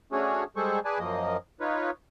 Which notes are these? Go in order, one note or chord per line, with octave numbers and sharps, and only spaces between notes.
A3 C#4 D4 F#4 G#4 C#5
G3 G#3 G#4 A4 C5 C#6
G#4 B4 D5 G#5 A5
F#2 F3 A#3 D#5
D#4 F4 B4 C#5